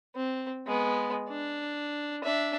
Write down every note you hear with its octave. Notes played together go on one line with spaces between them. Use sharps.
C4
G#3 B3
D4
D4 E5